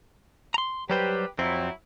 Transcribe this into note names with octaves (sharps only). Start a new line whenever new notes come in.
A#5 C6
F#3 G3 G4 B4 C5
F2 F#3 C4 E4